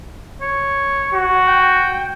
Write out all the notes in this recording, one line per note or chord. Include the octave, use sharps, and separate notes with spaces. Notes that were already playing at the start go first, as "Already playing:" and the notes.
C#5
F#4
G5